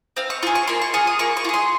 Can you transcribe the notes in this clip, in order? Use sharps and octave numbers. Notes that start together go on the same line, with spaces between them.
C4 F5
C#6
F4 G#4 C#6
C#6
A#3 C6
C#6
F4 G#4 C#6
D#6
A#3 C#6
C#6
F4
G#4 C6